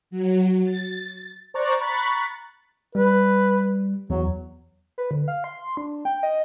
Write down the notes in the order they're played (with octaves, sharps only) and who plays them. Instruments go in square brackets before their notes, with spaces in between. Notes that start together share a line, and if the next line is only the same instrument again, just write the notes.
[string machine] F#3
A6
[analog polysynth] C5 D5 A#5 C#6 F#6 A6
A#5 B5 C#6 F#6 A6 B6
[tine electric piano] G3 [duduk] B4
[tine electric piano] E2 [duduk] F#3
[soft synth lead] B4
D3
F5
C6
D4
G5
D#5